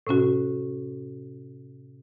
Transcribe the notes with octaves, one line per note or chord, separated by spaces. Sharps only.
A2 C3 C#4 F#4